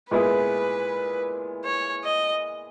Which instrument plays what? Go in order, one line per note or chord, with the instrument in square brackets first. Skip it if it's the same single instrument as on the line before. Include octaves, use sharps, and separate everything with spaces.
[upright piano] A#2 G#3 B3 E4 G#4 [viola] B4
[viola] C#5
D#5